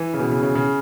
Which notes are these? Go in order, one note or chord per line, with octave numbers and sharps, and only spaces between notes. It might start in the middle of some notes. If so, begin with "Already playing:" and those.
Already playing: E3
C#3
B2
C#3
C#3
C#3